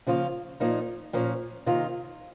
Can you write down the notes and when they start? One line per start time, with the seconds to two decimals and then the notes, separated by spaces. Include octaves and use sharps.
0.07 C#3 F3 A#3 C#4 F4
0.60 A#2 F3 A#3 D#4
1.13 A#2 F3 A#3 C#4
1.66 C3 D#3 A#3 F4